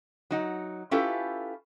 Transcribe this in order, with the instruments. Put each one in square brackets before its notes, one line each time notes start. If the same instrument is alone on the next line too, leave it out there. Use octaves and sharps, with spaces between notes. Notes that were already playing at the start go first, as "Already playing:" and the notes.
[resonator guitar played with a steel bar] F#3 D#4 F#5
C#4 E4 F4 G4 A4 B4